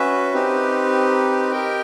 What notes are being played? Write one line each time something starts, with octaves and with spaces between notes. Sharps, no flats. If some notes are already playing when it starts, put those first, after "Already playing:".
Already playing: C#4 F#4 B4 E5
C4 D#4 G4 B4
G4 A#4 D#5 G5